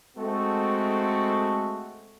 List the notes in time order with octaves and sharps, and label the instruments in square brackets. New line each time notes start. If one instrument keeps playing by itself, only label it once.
[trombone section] G#3 A3 C4 F#4 A4